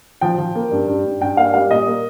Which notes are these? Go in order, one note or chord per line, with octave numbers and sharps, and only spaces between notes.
F3 G5
F3
A#3
G2
G2
G2
G2 G5
A#3 F5
G3 F5
A#2 D#5
A#3